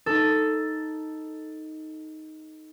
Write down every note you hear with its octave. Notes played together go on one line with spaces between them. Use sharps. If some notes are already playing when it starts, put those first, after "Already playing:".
D#4 A4